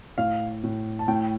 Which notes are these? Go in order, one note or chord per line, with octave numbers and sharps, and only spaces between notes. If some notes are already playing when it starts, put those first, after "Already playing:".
A2 F5
A2
A5
A2 G5